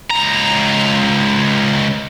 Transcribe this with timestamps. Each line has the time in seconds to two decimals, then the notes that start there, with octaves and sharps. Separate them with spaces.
0.11 C#2 A#5